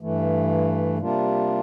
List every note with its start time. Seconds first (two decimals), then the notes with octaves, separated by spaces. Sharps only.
0.01 G2 E3 A3
0.98 C3 G3 A#3 D4 F4